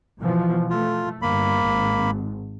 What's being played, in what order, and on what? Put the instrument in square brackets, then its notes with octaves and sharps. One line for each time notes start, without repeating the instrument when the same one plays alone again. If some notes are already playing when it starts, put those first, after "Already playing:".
[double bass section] B2 E3 F3
[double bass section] A3 [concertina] F4
[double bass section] G1 [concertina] A#3 B5
[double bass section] G#1